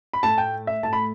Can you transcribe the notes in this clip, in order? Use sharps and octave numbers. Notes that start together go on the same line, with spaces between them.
B5
A2 A3 A5
G5
E5
A2 A3 A5
B5